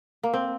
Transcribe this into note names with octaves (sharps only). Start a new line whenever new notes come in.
A#3
C4